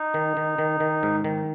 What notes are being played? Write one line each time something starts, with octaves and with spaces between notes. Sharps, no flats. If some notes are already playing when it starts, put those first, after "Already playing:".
Already playing: D#4
D#3
D#3
D#3
D#3
G#2
D#3